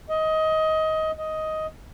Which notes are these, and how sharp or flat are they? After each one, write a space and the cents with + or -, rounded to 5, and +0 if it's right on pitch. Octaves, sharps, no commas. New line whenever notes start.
D#5 +20
D#5 +10